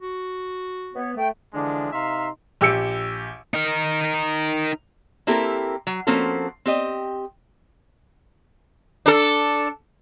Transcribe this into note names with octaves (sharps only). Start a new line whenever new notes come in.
F#4
B3 C#5
A3 G5
D3 E3 F3 G#3 D4
C3 D#4 E5 F5 A#5 C6
A#1 G4 E6 C#7 D7
D#4 A#4
A#3 C4 E4 G4 A4 A#4
F#3
F3 A#3 C4 C#4 F#4 A4
C4 G4 D#5
D4 A4